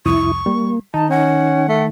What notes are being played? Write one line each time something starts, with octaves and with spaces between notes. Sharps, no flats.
C2 F2 E4 C#6 D#6
G3 A#3
D#3 D#4 D#5 A5
C#4 F#5
A3